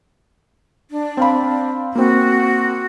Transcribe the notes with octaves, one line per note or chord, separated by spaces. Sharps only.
D4
C4 F5 B5
A#3 C4 F#4